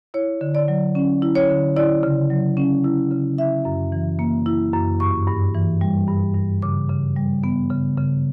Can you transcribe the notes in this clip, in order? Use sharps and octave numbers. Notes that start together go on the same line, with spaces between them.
E4 C#5
D3
D5
F#3
C#4
E4
C#5
D3
E4 D5
C#3
F#3
C#4
E4
C#3
E4 E5
F#2
E3
A#3
E4
F#2
G2 C#6
G2
E3
G3
G2
G2
C#3 D6
C#3
G3
B3
C#3
C#3